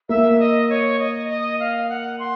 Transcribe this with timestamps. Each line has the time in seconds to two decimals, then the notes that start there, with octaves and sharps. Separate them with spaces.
0.09 A#3 E5
0.40 D#5
0.70 C#5
0.99 D#5
1.29 D#5
1.60 F5
1.89 F#5
2.19 C6